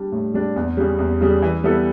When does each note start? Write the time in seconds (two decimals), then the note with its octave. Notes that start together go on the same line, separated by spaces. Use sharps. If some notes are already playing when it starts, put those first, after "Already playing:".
Already playing: G3 D4
0.12 A2
0.34 G3 D4
0.56 E2
0.77 C#3 G3
0.99 E2
1.21 C#3 G3
1.42 E3
1.64 G3 B3 E4 A4